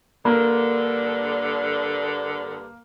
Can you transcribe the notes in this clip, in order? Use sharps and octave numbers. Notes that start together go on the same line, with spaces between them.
G2 D3 A#3